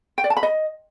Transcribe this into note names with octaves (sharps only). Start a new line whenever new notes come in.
G5
D5
A5
B5
D#5